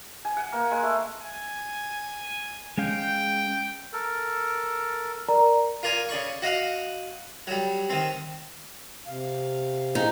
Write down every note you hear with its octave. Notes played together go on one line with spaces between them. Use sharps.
G#5
F#5
A#3
G#3
A3
G#5
G#3 C#4 F5 G5
A4 A#4
A#4 D5 A#5
F4 A#4 D5 G#5
C#3 D5 C#6
F#4 D#5 F5 F#5
F#3 G3
D#3 C4
C3 F5
A2 C4 D#4 G#4